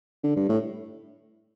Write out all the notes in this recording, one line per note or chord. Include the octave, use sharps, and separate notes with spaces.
D3
G2
A2